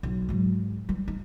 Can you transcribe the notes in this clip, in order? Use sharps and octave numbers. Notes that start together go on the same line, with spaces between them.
B1
G#2 F#3
E3 G3
D#4